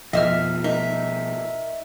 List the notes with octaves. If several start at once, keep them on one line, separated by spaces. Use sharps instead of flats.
F2 B2 F3 D#5 E5 E6 F6
D#4 A#4 E5